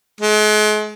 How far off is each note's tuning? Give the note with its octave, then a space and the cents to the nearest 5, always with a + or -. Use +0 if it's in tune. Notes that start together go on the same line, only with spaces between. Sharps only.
G#3 +40